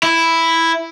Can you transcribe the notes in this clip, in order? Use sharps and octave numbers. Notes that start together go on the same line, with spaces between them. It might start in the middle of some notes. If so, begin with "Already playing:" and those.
E4